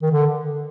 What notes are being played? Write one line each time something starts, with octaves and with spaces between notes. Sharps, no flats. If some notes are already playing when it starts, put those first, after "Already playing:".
D#3
D3